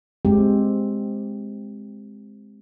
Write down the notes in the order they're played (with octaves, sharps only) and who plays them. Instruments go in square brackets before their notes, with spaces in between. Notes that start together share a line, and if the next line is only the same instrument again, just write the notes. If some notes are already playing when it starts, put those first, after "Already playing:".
[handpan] G#3 C4 G4